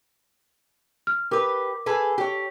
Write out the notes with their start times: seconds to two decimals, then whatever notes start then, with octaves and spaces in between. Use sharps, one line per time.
1.07 F6
1.31 G4 A#4 B4 D6
1.86 G#4 A4 B4
2.18 G4 C#5